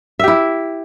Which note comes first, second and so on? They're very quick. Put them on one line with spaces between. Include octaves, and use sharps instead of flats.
E5 G4 E4